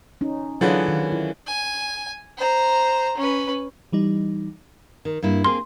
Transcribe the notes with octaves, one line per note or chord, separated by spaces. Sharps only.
C#4 D#4
D3 E3 F#3 C#4 F4 G#4
D#3
E4
G#5
C5 A#5
C#4 B4
E3 G3 D#4
D#3
G2 A#3 E4
A#3 C4 G#4 C6